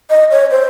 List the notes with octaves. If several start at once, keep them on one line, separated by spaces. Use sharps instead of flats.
D#5
C#5
C5